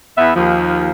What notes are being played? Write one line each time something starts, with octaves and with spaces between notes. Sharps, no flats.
E2 B3 E5
D#2 F3